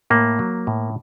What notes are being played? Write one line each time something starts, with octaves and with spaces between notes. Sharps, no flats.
A2 A#3
F#3
A2